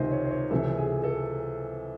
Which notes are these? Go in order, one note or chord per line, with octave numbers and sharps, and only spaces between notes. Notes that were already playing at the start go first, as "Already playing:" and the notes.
Already playing: C#2 C3 D#3 C5 D#5
C#5
C5
C#5
C#2 C3 E3 A4
G#4
A4